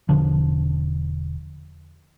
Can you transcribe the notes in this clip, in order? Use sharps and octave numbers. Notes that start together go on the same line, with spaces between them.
E1 C#2 D3 F3